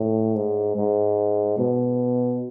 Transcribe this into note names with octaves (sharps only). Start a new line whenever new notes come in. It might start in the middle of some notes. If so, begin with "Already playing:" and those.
Already playing: A2
G#2
G#2
B2